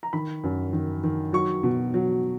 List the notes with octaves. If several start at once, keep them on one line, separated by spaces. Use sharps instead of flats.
A#5
D#3 B5
F#2
D#3
D#3
F#3 C#6
B2
F#3